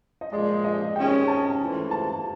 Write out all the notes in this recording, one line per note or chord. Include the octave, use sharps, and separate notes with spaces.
D#5
A#2 F3 G#3 D5
D#5
C3 D#3 G#3 C#4 G5
A5
G#2 E3 A3 C4 F4
A5